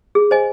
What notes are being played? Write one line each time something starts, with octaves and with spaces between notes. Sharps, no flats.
G#4
C5 D#5 G#5